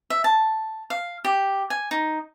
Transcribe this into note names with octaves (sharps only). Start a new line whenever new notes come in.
E5
A5
F5
G4
G#5
D#4